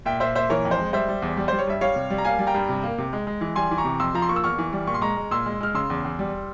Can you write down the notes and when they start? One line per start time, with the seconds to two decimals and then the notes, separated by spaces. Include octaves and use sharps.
0.06 A#2 E5 G5
0.20 A#2 C5 E5
0.35 A#2 C5 E5
0.50 E3 A#4 C#5
0.65 F2
0.71 C5
0.78 G#3
0.93 G3 C5 E5
1.09 G3
1.22 E2
1.37 G3
1.48 G3 C5
1.59 C#5
1.67 G2 E5
1.81 G3 C#5 F5
1.96 C3
2.10 G3
2.18 A#5
2.25 A#3 F5 G#5
2.39 G3
2.47 G5 A#5
2.54 G2
2.69 C3
2.84 A#3
2.98 C3
3.13 G#3
3.27 G#3
3.41 E3
3.56 G3 G#5 C6
3.71 E3
3.78 A#5 C#6
3.85 C3
4.00 F2 C6 E6
4.14 F3 A#5
4.22 C6
4.29 A#3 C#6
4.36 E6
4.44 E2 C#6 F6
4.58 E3
4.73 G3
4.87 A#2 C#6
4.94 C6
5.01 G#3 A#5 C#6
5.17 G#3
5.31 A#2 C6 E6
5.46 G#3
5.61 G#3 F6
5.74 C#3 C6 E6
5.90 E2
6.05 E2
6.19 G3